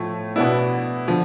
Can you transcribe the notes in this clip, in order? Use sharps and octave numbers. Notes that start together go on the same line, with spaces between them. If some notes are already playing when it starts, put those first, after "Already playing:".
Already playing: A2 F3 A3
B2 B3 D4 E4
D3 F3